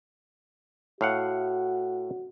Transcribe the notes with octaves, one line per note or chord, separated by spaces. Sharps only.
A2 F#4 F5 F#5